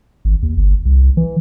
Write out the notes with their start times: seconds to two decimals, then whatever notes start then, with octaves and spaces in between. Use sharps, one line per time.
0.25 G#1
0.43 D#2
0.57 G1
0.86 C2
1.17 E3